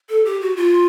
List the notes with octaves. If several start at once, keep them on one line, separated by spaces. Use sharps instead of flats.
A4
G4
F#4
F4